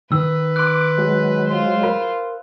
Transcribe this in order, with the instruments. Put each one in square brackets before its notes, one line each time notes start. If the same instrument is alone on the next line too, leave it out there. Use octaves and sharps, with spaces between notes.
[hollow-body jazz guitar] D#3 [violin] B4 [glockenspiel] E6
[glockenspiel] C6 F#6 [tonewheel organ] D6
[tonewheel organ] F#3 G#3
[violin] F4 C5
[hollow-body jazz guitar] A#4 B5